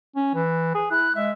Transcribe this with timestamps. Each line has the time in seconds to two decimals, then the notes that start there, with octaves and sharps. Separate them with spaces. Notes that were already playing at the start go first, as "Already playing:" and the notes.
0.16 C#4
0.35 E3
0.75 G#4
0.91 E4 F#6
1.15 G#3 E5